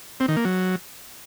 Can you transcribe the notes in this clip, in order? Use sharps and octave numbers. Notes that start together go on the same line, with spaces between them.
C4
D#3
A#3
F#3